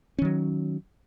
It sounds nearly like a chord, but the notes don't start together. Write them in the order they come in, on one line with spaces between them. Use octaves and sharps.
C#4 D#3 F#3